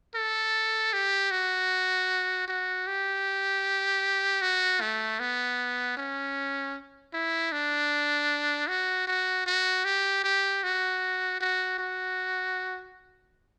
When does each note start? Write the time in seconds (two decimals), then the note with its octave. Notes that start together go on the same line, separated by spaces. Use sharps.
0.15 A4
0.93 G4
1.31 F#4
2.48 F#4
2.87 G4
4.42 F#4
4.81 A3
5.20 B3
5.97 C#4
7.13 E4
7.52 D4
8.68 F#4
9.07 F#4
9.46 F#4
9.85 G4
10.24 G4
10.63 F#4
11.40 F#4
11.79 F#4